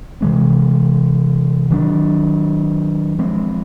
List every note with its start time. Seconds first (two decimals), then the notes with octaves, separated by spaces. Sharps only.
0.21 C3 E3 G#3 C4
1.70 D#3 F#3 A3 D4
3.19 F3 G#3 C4